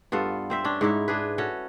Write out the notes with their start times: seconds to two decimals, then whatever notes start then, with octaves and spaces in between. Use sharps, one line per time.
0.12 G2 B3 F4 A4
0.50 C4 C5 E5
0.64 C#4 D4
0.81 G#2 D#4 E4
1.08 D4 G#4 B4
1.38 C#4 F#4 A4